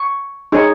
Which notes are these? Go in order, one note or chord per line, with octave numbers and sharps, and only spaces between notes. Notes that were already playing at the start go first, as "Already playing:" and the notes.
Already playing: C#6
D#4 G#4 C#5